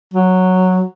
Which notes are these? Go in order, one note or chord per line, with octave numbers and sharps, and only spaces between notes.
F#3